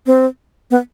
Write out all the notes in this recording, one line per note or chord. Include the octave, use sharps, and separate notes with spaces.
C4
B3